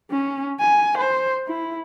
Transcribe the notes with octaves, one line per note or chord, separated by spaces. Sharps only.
C#4
G#5
C5
E4